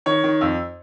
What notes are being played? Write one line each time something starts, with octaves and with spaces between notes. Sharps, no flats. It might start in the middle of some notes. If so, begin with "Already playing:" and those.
D#3 C#5
D#3
F2